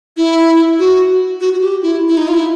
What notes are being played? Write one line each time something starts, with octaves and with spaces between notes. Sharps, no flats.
E4
F#4
F#4
F#4
G4
E4
E4
D#4
F4
E4